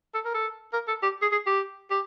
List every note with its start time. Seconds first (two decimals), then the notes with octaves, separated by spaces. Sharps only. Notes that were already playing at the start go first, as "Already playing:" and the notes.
0.14 A4
0.25 A#4
0.34 A4
0.73 A#4
0.88 A4
1.03 G4
1.22 G#4
1.32 G#4
1.47 G4
1.90 G4